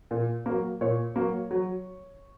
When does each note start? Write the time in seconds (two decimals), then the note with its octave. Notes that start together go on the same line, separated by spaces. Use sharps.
0.11 A#2
0.46 F#3 A#3
0.81 A#2 C#5
1.16 F#3 A#3
1.51 F#3